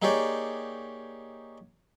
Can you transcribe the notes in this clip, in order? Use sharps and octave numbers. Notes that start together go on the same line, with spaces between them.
A#3 D#4 G4 G#4 C#5 D5